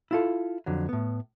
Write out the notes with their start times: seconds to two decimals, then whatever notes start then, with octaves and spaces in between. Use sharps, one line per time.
0.11 E4 F4 A4
0.66 F2 D3 F#3
0.89 A2 B3